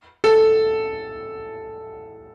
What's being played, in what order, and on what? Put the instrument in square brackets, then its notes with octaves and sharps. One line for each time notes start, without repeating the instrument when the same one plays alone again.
[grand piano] A4